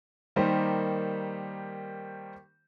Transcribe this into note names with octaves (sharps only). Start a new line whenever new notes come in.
D#3 G3 A#3 D#4 G4 C5